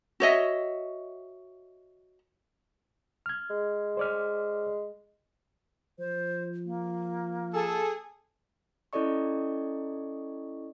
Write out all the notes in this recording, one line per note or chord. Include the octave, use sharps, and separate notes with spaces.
F#4 C#5 D#5 E5
F6 G#6
G#3
C5 D5 F6
F3 C5
A#3
G#4 A4
C#4 E4 A4 D5 D#5 C#6